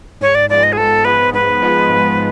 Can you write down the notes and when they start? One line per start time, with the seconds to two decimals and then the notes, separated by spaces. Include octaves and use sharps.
0.21 G#2 C#5
0.35 D5
0.50 F3 G#3 B3 D5
0.63 D#5
0.73 G#4
0.77 G#2 A4
1.05 F3 G#3 B3 B4
1.33 G#2 B4
1.62 F3 G#3 B3
1.89 G#2